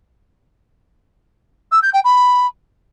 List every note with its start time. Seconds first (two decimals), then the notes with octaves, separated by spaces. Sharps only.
1.72 E6
1.82 G6
1.93 G5
2.04 B5